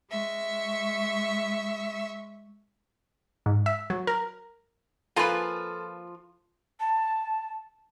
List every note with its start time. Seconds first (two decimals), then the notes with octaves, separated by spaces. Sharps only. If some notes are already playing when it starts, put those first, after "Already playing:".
0.10 G#3 E5 C#6
3.46 G#2
3.66 E5
3.90 F#3
4.07 A#4
5.16 F3 A#3 F4 A4 B4 G#5 D#7
6.80 A5